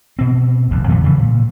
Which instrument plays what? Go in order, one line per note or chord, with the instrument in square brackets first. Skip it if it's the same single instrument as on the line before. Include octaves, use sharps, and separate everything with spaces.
[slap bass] B2 C4
F1 A#1 D#2
F2 A#2 D#3 E3
C#3 E3 F3 G3
A#2